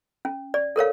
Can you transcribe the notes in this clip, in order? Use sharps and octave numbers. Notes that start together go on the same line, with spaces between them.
C#4
D5
A4 A#4 C#5 F5